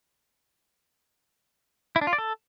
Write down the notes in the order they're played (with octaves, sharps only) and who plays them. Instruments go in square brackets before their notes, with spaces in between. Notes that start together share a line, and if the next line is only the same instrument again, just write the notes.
[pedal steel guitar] E4
D4
F4
D5
A4